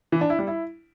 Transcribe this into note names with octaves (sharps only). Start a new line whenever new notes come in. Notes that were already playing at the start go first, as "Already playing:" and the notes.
E3
D4
E4
G3
E4